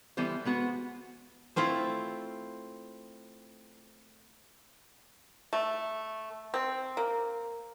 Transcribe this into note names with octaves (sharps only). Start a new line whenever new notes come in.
E3 G3 B3 A4 C5
G#3 B3 F#4
A3 C4 E4 F4
A3
C4
A#3